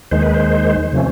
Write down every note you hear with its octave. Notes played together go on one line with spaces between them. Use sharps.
D#2 D#3 G#3 C5
B4
C5
C3 F3 A3 C#4